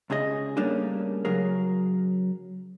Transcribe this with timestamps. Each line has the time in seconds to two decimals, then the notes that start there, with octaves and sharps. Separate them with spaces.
0.10 C#2 C#3 G#4 D#5
0.57 G3 A3 A#3 C#4 D4 G#4
1.25 C#3 F#3 G#4 A#4